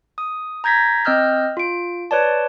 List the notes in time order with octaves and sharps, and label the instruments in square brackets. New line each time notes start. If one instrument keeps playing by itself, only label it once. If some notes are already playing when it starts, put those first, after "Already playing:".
[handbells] D#6
A#5 G6 G#6 A#6 B6
C4 D#5 E6 F6 G6
F4 D7
B4 C#5 D5 A5